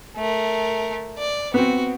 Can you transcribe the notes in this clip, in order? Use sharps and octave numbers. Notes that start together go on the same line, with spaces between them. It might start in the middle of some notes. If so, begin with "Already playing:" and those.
A3 A#4
D5
B3 C4 F#4